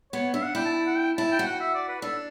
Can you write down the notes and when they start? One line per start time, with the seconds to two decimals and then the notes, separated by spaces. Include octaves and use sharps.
0.13 B3 C#5
0.34 D4 E5
0.44 F#5
0.55 E4 G5
0.65 A5
0.86 F#5
0.97 G5
1.18 E4 A5
1.32 G5
1.39 F#4
1.47 F#5
1.61 E5
1.74 D5
1.89 B4
2.02 D4 A4